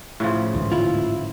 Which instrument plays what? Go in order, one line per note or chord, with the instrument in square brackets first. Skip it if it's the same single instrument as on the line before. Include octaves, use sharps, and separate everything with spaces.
[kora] A2 C#3 F3
[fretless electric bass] D2 G#2 E3
[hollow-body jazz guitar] E4 F4